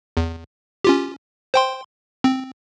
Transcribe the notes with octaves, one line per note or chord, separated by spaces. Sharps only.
E2
C#4 F4 G4
C5 G5 C6
C4